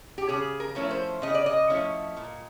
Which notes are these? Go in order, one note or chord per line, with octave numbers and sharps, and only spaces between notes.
G4
C#3 G#4
A#4
F3 A3 C#4 E4
C5
C#3 D#5
D5
D#5
F3 A3 C#4 E4
A#2